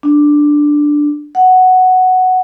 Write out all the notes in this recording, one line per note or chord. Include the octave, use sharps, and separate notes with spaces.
D4
F#5